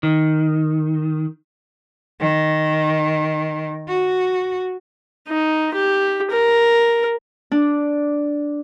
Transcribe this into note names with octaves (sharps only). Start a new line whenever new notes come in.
D#3
D#3
F#4
D#4
G4
A#4
D4